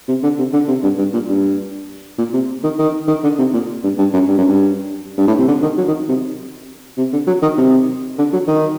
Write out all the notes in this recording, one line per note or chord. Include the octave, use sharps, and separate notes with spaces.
C3
D3
C3
D3
C3
G2
G2
A#2
G2
A#2
C3
D#3
D#3
D#3
D3
C3
A#2
G2
G2
F#2
G2
F#2
G2
G2
A2
C3
D3
D#3
F#3
D#3
C3
C3
D3
F#3
D#3
C3
D3
F#3
D#3